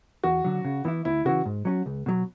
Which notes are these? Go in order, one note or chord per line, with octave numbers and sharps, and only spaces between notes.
E2 F#4
D3 F#3
C#3
E3 B3 E4
D2 E4
C#3 E3 F#4
G#2
F#3 C#4 F#4
C#2
B2 F#3